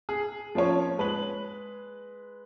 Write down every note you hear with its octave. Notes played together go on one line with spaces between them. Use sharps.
G#4
F3 A#3 C#4 C#5
G#3 B4 F#7